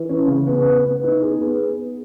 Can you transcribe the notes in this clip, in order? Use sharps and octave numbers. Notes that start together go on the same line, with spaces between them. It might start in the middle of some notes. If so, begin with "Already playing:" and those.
Already playing: E3
C#4
C#3
B3
B3
B3
D#4
G#4
B3